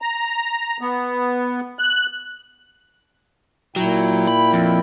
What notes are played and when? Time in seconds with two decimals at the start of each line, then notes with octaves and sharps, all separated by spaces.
0.02 A#5
0.81 B3
1.79 F#6
3.76 A#2 F#3 E4 G5
4.27 B5
4.53 F2